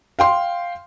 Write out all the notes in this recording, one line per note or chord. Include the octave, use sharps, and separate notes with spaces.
F5 G5 C6